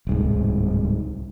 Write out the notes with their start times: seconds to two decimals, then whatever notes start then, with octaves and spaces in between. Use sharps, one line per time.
0.07 D1 C2 G#2